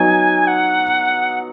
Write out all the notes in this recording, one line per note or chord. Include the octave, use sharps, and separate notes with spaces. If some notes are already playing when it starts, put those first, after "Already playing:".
Already playing: F#3 B3 D#4 G#5
F#5